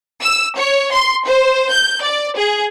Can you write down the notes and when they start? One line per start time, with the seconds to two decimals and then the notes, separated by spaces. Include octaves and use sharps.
0.22 E6
0.57 C#5
0.92 C6
1.27 C5
1.71 G6
2.02 D5
2.36 G#4